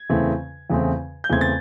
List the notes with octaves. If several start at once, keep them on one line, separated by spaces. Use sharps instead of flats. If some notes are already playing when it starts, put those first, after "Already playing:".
Already playing: G#6
E2 C#3 E3 A3 C4
E2 C#3 E3 A3 C4
G6
E2 C#3 E3 A3 C4 G#6
A6